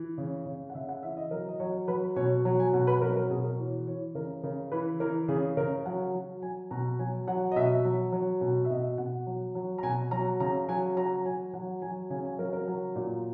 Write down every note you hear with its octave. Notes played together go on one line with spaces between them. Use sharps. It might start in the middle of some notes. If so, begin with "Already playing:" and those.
Already playing: E3
C#3
C#3
F#5
C#3 E5
F#5
E3 E5
D#5
F#3 A#4
D#5
F#3 C#5
F#3 B4
B2 C#5
F#3
G#5
B2 F#5
B4
F#3 A#4
B4
A#4
B2 G#4
A#4
E3 C#5
E3 C#5
C#3 A#4
C#3 A#4
E3 B4
E3 A#4
C#3 G#4
C#3 A#4
F#3 F#5
F#3
F#3 G#5
B2 A#5
F#3 G#5
F#3 F#5
D#5
B2 E5
F#3
F#3
B2
E5
B2 D#5
B2 F#5
F#3
F#3
A#5
B2 G#5
F#3 A#5
C#3 A#5
F#3 G#5
F#3 A#5
F#3 G#5
F#3 F#5
F#3 G#5
C#3 G#5
G#5
F#3 A#4
A#4
F#3
A#2